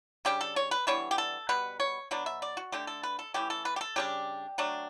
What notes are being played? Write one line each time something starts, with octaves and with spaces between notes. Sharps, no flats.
C#3 G3 D4 G4
A4
C#5
B4
E3 G3 B3 D4 C#5
G4
A4
B2 G3 B3 B4
C#5
B2 F#3 B3 D4
E5
D5
F#4
D3 A3 D4 G4
A4
B4
A4
E3 A3 C#4 G4
A4
B4
G4
A4
C#3 G3 D4 G4
F#3 A3 D4